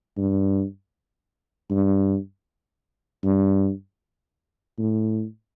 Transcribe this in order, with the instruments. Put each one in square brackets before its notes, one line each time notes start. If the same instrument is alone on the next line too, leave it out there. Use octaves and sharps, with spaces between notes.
[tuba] G2
G2
G2
A2